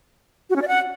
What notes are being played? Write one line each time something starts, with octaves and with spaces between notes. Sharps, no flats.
F#4
C#4
D5
F#5